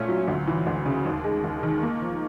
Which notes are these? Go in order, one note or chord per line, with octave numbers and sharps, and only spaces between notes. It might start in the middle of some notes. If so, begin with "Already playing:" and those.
Already playing: A#2 A3 C#4
F#3
D2
E3
D2
C#3
D#2
G#3
D#2
D#3
A#3
F3